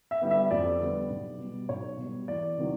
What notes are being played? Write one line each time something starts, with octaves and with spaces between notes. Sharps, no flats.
E5
D3 G3 B3
E5
F2 D5
D3 G3 B3
B1
B2 G3
B1 C#5
B2 G3
E2 D5
C3 D#3 F#3